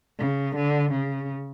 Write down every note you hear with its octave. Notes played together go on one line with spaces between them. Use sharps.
C#3
D3
C#3